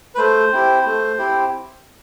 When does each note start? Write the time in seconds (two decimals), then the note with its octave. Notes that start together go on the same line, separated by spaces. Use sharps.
0.15 B4
0.18 A3 C5
0.53 C4 E4 G4
0.86 A3
1.18 C4 E4 G4